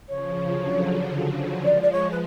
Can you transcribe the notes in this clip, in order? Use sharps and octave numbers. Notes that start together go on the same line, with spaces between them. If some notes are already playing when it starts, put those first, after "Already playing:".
C#3 F3 C#5
D3 F#3
D3
F3 G#3 D5
D5
C#5
B4